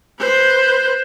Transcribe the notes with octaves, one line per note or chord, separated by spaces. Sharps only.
B4 C5